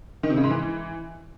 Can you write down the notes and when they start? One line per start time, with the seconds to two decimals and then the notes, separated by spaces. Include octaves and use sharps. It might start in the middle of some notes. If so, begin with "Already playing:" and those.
0.23 D#3
0.30 C3
0.37 C#3
0.44 G#2
0.50 E3